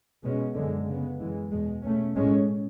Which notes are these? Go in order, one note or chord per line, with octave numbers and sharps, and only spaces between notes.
B2 G#3 C#4
F#2 D3 G#3
C#3 G#3 B3
F#2 E3 G#3
E2 B2 G#3
B2 A3 C#4
A2 G#3 C#4